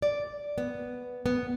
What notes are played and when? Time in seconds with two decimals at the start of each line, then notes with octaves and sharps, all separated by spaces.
0.02 D5
0.58 B3
1.26 B3